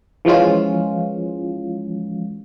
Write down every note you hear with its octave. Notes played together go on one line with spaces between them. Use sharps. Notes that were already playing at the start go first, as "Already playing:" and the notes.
E3 F3 G#3 C#4 F4